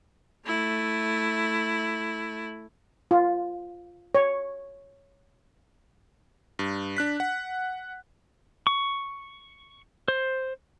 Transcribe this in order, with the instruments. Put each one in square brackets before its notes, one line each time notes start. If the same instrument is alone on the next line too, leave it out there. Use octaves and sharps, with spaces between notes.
[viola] A3 E4
[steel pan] F4
C#5
[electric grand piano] G2
D4 F#6 B6
F#5
[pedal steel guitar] C#6
C5